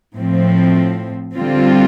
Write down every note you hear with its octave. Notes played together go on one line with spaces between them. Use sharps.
A2 F3 C4
D3 G3 C4 F4